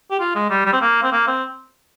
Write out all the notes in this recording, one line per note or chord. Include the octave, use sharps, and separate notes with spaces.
G4
F4
G#3
G3
G3
C4
A#3
C4
A#3
C4